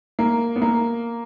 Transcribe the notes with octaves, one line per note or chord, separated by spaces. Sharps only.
A#3
B3
A#3